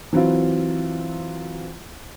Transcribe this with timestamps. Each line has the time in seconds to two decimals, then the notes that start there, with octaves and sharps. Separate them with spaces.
0.13 E3 F#3 C4 E4 F4